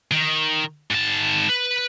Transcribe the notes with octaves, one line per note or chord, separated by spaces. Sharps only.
D#3
G#2 A5
B4